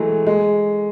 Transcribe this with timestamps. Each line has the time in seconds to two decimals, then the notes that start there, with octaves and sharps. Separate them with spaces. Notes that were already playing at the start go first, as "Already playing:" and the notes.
Already playing: E3 F#3 G#3 A3
0.27 G#3